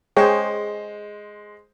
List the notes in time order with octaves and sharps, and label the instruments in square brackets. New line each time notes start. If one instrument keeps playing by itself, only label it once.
[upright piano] G#3 C5 [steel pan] G#4 C#5 G5